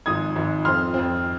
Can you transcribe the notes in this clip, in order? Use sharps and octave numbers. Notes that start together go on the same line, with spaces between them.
G#1 G#2 F3 D#6 G#6
G#1 G#2 F3
F2 F3 C4 C6 F6
F2 F3 C4